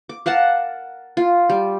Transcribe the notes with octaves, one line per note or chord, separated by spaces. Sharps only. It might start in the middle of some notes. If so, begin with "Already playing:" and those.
D6
A#4 F5 F#5 A5
F4
G3